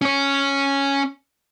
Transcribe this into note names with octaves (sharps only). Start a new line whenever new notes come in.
C#4 C#5